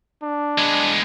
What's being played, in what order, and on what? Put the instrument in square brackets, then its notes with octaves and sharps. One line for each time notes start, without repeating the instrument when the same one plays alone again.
[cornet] D4
[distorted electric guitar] G#3 B3